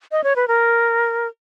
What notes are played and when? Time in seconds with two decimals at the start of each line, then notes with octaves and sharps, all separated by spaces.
0.12 D#5
0.24 C#5
0.36 B4
0.48 A#4